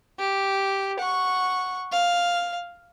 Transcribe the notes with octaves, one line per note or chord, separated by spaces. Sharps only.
G4
F#5 C#6
F5